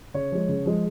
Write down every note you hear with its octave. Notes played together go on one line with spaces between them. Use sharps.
C#3 C#5
F3 G#3
C#3
F3 G#3